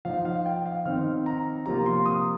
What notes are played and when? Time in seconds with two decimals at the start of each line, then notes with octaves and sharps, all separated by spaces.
0.05 F3 D#4 F5
0.25 F5
0.46 G5
0.66 F5
0.85 D#3 C4 D#4 F6
1.26 A#5
1.66 C3 F3 A#3 F4 A#5
1.86 C6
2.06 D#6